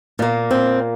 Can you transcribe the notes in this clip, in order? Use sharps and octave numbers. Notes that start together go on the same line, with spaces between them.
A#2 A#3
C4